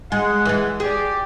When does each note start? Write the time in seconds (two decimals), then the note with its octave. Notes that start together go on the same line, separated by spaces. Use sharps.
0.12 G#3 F#5
0.46 E3 G#3
0.80 G4 G#4 D5